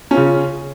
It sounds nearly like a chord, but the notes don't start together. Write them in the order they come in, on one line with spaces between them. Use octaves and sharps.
C#4 F4 C#3